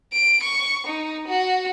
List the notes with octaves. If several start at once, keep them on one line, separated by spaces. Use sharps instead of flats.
D7
C#6
D#4
F#4